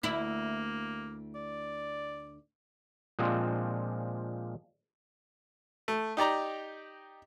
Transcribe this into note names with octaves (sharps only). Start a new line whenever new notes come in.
D2 A#3 E4
D5
A#2 F3 G#3 C4 D4
A3
D#4 G4 D5 A#5